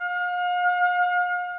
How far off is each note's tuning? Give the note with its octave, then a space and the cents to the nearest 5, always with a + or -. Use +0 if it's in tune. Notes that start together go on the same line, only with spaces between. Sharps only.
F5 +40